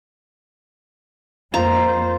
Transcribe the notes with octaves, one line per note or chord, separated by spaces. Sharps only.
F2 A#3 F4 C5 A#5